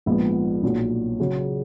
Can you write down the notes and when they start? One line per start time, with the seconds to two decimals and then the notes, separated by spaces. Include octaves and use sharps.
0.06 A#1 G#2 F3 B3
0.63 B1 A#2 F#3
1.20 C#3 F#3 C#4 G#4